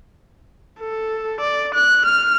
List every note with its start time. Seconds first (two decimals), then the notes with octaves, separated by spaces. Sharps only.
0.81 A4
1.40 D5
1.74 F#6
2.05 F6